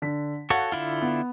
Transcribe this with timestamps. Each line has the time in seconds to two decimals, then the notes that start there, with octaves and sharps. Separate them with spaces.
0.02 D3 B6
0.50 F#4 A4 C#5 F5 F#5
0.72 D3 E4 F4
1.02 B3